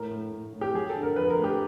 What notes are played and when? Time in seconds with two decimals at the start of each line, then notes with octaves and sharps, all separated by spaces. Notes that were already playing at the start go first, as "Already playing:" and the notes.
Already playing: A2 A#4
0.11 A2
0.32 A2
0.53 A2
0.61 G4
0.74 F#3 G#4
0.89 A4
0.95 D3
1.03 A#4
1.16 F2 B4
1.30 A#4
1.37 A3
1.44 G4